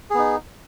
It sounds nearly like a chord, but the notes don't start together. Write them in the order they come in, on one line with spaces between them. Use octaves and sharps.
G#4 B3 D#4